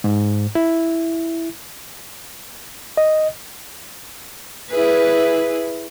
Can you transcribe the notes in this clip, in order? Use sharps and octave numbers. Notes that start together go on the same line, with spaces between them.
G#2
E4
D#5
E4 G#4 B4